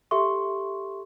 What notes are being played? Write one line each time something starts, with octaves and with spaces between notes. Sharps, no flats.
G4 A4 E5 C6 C#6